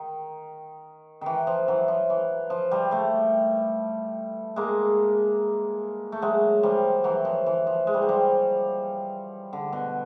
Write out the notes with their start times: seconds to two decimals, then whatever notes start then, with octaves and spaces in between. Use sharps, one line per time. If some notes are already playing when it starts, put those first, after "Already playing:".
Already playing: D#3
1.21 D#3 E3
1.47 F3
1.68 E3 F#3
1.88 F3
2.10 E3
2.50 F3
2.71 F3 G3
2.91 G3 A3
4.56 G#3 A#3
6.12 A3
6.22 F#3 G#3
6.63 F3 G3
7.04 E3 F#3
7.25 F3
7.46 E3
7.67 F3
7.87 G#3
7.94 G3
8.02 F#3
8.09 F3 G3
9.53 D3
9.73 B2